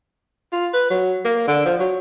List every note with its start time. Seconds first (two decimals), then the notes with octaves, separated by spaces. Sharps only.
0.52 F4
0.74 B4
0.90 F#3
1.25 A#3
1.47 D3
1.66 F3
1.80 F#3